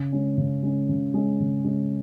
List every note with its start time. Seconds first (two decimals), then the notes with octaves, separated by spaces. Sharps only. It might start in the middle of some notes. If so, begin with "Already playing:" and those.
Already playing: C#3
0.12 G#3 C#4
0.38 C#3
0.63 G#3 C#4
0.89 C#3
1.14 G#3 C#4
1.40 C#3
1.64 G#3 C#4